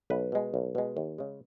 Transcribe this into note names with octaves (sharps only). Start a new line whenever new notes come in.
B1 B4
B2 G#3
B1
B2 G#3
D#2
C#3 G#3